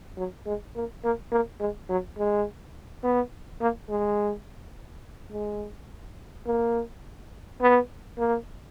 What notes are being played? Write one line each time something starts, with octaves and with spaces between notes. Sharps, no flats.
F#3
G#3
A#3
A#3
A#3
G#3
F#3
G#3
B3
A#3
G#3
G#3
A#3
B3
A#3